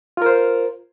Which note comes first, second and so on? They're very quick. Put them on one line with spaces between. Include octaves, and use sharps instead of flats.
F4 A#4 C5